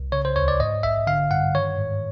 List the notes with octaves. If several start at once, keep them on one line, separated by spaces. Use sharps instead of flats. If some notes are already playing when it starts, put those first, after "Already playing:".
Already playing: C2
C#3 C#5
C5
D2 C#5
D5
G#2 D#5
A#1 E5
D3 F5
G2 F#5
D#3 C#5
G#2